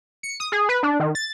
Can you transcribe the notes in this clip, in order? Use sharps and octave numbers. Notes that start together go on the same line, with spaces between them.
C#7
D#6
G#4
B4
D4
D#3
A6